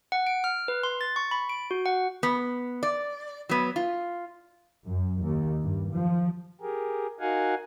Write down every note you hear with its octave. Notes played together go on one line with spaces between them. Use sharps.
F#5
D7
F6
B4
C6
A6
C#6
B5
D7
F#4
F#5
B3
D5
F#3 B3
F4
F#2
D#2
G2
F3
G4 G#4 A#4
D#4 F#4 A#4 F5 F#5 G#5